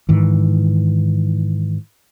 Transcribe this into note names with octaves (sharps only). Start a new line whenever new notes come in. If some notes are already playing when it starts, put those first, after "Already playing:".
G#2 D#3 E3